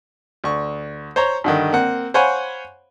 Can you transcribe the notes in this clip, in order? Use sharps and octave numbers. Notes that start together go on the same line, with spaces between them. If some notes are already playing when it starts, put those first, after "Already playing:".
D2 C#6
C5 C#5 A#5
G2 D3 D#3
A#3 C4 F#5
C5 C#5 F5 F#5 G#5 B5